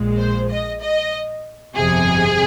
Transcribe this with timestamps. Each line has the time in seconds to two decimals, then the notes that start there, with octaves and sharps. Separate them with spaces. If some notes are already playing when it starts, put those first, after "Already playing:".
Already playing: A#1 A#2 G#3
0.17 C5
0.49 D#5
0.81 D#5
1.75 G1 F2 C3 G#4